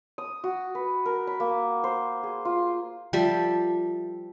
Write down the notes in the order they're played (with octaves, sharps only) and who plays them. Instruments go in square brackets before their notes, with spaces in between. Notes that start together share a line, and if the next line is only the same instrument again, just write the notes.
[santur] D#6
F#4
B4
A#4
B5
A#3
C5
G#4
F4
[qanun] F3 G3 A4 E5